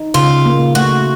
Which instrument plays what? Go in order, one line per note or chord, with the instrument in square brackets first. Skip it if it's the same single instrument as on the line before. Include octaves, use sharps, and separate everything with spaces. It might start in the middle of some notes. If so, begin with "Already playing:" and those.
Already playing: [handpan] D#4
[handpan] C#3 [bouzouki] F4
[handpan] A#3
[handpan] A3 [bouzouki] F#4